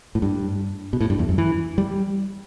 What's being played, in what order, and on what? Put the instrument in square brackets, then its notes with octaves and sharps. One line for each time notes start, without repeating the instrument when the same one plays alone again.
[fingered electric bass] A2
G2
B2
A2
G2
E2
F#2
E3
G3